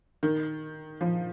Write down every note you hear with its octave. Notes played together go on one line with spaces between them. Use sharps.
D#3
F3